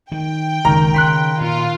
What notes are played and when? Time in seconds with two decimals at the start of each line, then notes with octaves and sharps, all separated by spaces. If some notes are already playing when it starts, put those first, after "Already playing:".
0.12 D#3 G5
0.65 F#1 C#2 D#3 A#5
0.94 C#3 B5 C6 F#6
1.41 A#2 F4